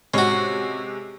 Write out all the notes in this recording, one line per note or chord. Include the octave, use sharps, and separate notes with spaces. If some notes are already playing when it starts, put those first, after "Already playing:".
C3 G#3 C#4 F#4